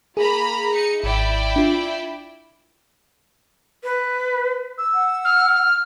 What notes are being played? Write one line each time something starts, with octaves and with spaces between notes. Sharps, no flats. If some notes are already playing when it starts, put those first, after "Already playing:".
A#3 G#4 A#5 B5
D#4 C#7
G#1 E4 D5 G5
D4 F4
B4
E6
F#5
F6